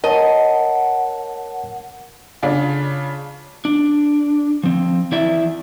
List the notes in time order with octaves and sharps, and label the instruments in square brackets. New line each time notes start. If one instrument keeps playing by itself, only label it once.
[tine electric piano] A#4 C#5 A5 [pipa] D#5 [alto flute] F#5
[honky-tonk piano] C#3 D4 F4
[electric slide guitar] D4
F3 C4
E3 E4 D5 E5